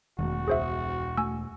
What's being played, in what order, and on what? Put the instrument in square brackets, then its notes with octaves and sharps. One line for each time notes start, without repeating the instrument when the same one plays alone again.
[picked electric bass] E1 [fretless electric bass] D#3 A3 [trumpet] F#4
[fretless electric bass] C#2 [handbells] G#4 C5 E5
[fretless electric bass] A3 [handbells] G#5 E6